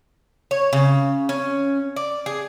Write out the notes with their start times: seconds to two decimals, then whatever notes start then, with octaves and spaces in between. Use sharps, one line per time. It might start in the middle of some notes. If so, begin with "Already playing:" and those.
0.51 C#5
0.73 C#3
1.29 C#4
1.96 D5
2.26 G#4